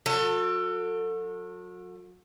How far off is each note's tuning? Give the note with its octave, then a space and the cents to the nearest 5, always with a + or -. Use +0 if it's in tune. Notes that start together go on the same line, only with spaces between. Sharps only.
F#3 -35 A4 +25